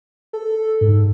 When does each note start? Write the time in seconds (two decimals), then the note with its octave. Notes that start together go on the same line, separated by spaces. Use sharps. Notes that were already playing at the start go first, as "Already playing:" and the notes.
0.33 A4
0.81 G#2